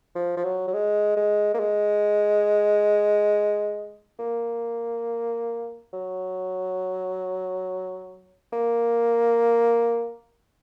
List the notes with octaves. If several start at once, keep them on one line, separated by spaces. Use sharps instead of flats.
F3
F3
F#3
F#3
G#3
G#3
A#3
G#3
A#3
F#3
A#3